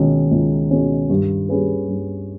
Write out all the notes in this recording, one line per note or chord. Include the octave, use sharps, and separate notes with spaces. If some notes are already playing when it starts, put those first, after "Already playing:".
Already playing: C#2 B2 D#3 G#3 C#4
C#2
B2 G#3 C#4
G2
G3 C#4 G#4 B4
G2